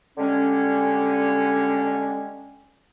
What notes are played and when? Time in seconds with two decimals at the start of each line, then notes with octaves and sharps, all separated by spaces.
0.18 D3 G3 G#3 C#4